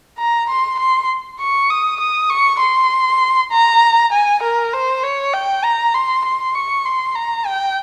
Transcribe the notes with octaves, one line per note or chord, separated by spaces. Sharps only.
A#5
C6
C6
C#6
D#6
D#6
C#6
C6
A#5
G#5
A#4
C5
C#5
G5
A#5
C6
C6
C#6
C6
A#5
G5